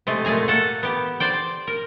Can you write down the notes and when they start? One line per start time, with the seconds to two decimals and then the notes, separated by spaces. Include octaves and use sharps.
0.07 C3 G#3 A3
0.25 A#2 A3 G#4 G#5 A#5
0.48 A#3 A4 F#5
0.83 B3 G4
1.20 C5 D5 G5
1.67 A#4